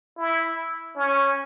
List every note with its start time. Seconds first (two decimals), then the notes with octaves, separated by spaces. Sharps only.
0.18 E4
0.96 C#4